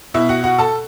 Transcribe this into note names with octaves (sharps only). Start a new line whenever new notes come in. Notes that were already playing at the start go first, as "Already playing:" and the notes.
B2 E4 E5
F#4 F#5
F#4 F#5
A4 A5